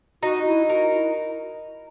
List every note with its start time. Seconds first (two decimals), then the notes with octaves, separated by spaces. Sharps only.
0.23 D#4 F#4
0.46 E4
0.70 F#4 A#4
0.93 E4